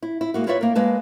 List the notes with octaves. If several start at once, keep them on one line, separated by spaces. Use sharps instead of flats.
E4
E4
G#3 A#3 F#4
E4 F4 B4 C#5 D5 E5
A#3 A#4
G#3 A#3 B4 A5